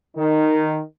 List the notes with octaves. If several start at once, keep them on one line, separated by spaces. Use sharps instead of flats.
D#3